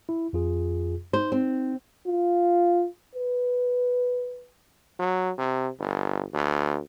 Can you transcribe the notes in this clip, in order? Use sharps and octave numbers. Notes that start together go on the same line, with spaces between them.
E4
F2 F4 G#4
D#4 C5
C4
F4
B4
F#3
C3
G1
D2